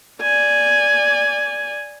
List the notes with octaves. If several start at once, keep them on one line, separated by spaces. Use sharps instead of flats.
D5 G#5